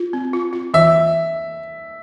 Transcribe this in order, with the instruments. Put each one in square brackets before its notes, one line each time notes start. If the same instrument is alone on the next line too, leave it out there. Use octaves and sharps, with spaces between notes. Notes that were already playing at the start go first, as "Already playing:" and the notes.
Already playing: [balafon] F4
C4
F4
F4
[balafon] E3 [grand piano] E5